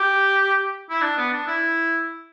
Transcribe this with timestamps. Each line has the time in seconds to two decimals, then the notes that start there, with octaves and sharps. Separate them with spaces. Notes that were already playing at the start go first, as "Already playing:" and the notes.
Already playing: G4
0.90 E4
1.01 D4
1.17 B3
1.32 D4
1.47 E4